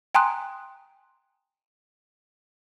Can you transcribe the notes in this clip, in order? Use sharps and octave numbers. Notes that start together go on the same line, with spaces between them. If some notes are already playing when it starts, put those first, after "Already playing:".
G5 G#5 A#5 C6 D#6 F#6